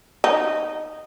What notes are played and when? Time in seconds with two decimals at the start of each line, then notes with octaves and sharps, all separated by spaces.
0.24 D#4